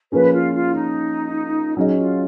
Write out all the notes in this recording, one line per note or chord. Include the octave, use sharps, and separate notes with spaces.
F3 A#3 C#4 G#4 B4
F4
F4
D#4
F#3 C#4 D#4 G#4 D#5
F4